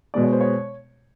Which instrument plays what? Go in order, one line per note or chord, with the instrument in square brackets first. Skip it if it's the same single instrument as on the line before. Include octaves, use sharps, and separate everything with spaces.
[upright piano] B2 G#3 B3 D5
C#5
C5
C#5